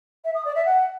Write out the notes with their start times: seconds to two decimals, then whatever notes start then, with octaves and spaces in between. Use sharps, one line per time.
0.24 E5
0.34 D#6
0.44 D5
0.55 E5
0.65 F#5